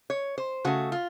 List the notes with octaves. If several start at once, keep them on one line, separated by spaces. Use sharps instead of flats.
C#5
C5
C#3 A3 F#4
F4